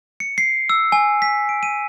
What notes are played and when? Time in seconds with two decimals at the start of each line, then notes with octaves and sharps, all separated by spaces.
0.20 C#7
0.38 C7
0.70 E6
0.92 G#5
1.22 B6
1.49 D7
1.63 D#7